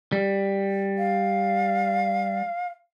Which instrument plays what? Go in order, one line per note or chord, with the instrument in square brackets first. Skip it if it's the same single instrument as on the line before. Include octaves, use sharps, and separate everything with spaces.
[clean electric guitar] G3
[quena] F5